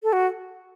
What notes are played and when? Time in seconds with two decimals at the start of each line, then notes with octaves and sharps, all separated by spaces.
0.03 A4
0.13 F#4